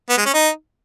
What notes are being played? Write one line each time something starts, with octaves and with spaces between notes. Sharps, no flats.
B3
G#3
C#4
D#4